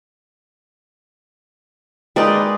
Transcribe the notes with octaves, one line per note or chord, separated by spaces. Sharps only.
G3 G#3 A#3 D#4 B4 D5